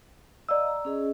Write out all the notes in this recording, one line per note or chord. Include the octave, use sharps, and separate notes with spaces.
D5 D#5 F5 A#5 E6
A#5
C#4 G#4 D#5